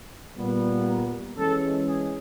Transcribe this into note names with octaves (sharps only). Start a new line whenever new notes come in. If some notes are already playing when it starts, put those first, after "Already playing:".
A#2 G3 B3
A#4
E3 G#3 C#4 A4
G#4